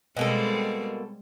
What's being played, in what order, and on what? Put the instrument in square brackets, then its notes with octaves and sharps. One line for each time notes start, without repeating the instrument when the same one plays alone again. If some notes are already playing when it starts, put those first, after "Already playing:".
[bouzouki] B2 A#3 A4 [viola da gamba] G3 G#3 C4